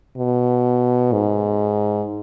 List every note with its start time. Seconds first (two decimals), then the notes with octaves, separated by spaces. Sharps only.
0.17 B2
1.13 G#2